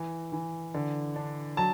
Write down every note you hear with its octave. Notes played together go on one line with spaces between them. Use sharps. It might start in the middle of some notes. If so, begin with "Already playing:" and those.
Already playing: E3
E3
D3
D4
F#3 A5